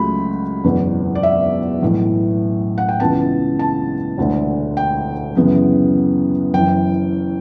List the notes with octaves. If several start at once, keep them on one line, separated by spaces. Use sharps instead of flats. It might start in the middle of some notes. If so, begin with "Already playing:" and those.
Already playing: C#2 C#3 F#3 A3 B5
F#1 E2 B2
D5
E5
B1 A2 E3
F#5
G5
C#2 C#3 E3 B3 A5
A5
E1 D2 D3 A3
G5
F#2 C#3 E3 B3
F#1 F#2 E3 G5